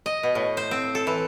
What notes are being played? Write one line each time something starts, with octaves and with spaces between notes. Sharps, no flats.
D#5
B2
A2
C5
C4
A4
E3